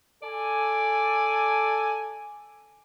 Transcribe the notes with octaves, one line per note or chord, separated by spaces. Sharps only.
A4 D5 G#5